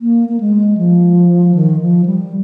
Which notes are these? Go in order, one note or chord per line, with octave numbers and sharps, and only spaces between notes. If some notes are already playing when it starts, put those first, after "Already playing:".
A#3
A#3
G#3
F3
D#3
F3
G3